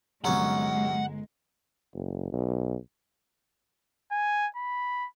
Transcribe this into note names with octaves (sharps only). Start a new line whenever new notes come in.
G1 C2 F#2 G#3 C#4 F#5 A#5
F#1
B1
G#5
B5